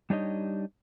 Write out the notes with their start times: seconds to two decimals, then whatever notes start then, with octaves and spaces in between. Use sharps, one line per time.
0.10 G3 D4 D#4 G4 C#5 D#5